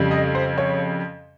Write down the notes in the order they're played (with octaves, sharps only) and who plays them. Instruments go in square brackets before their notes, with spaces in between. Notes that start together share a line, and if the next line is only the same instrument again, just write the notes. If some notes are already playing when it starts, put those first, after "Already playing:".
Already playing: [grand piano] F2 C#3 G3
D#5
C5
C#5